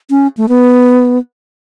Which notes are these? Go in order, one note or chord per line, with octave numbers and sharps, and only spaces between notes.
C#4
A3
B3